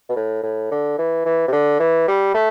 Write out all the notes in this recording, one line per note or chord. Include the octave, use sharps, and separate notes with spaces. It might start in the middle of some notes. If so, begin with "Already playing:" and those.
B2
A2
A2
D3
E3
E3
C3
D3
E3
G3
A3